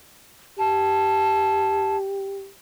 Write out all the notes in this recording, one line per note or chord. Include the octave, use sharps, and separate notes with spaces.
G4 A5